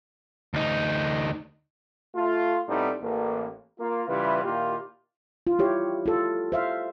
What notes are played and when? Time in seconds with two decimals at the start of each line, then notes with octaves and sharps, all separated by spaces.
0.54 D2 D#4
2.15 A3 F4
2.68 A2 G3 A3 B3 C4 D#4
3.01 A1 A#3
3.79 A#3 F4
4.08 C#3 E3 G3 E4 F4 B4
4.44 A#2 D#3 A#3 E4 F4 G4
5.47 F4
5.59 E4 G4 C#5
6.06 F4 A4
6.52 C5 E5 F5